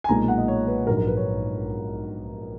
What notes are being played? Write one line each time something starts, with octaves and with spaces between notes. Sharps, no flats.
G#5
B1 A#2 G#3 A#5
F#5
D#5
C#5
B4
A#1 G#2 F#3 A#4
A#4
B4
C#5